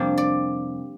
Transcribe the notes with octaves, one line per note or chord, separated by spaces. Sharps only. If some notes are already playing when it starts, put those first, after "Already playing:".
Already playing: F2 C3 G3 A#3 D4
D5